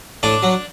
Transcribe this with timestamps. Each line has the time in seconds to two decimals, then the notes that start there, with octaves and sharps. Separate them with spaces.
0.23 A2 D4
0.43 F#3